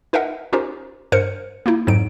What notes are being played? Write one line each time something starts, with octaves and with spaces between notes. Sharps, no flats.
D#4 A#4 B4 D#5 E5 F#5
C#4 D#4 F4 G4 A#4 C5
G2 A#4 C5 C#7
A#3 D#4 E4
F2 G#2 F#3 D#4 D7